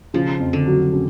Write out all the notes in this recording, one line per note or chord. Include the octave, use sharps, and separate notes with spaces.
C#3 F3
F2
D3
F#3
C#3